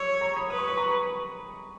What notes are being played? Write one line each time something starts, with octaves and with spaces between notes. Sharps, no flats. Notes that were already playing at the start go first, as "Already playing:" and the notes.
Already playing: C#5 C#6 E6
A#5 C#6
B5 D#6
B4 D#6
C#6
B5
A#5 C#6